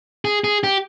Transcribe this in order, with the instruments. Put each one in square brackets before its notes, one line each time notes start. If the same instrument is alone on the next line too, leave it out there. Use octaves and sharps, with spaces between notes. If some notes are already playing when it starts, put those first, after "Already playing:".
[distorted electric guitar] G#4
G#4
G4